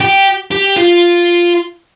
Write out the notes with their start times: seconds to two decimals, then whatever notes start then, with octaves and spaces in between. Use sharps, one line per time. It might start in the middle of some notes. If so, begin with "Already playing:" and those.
0.01 G4
0.51 G4
0.77 F4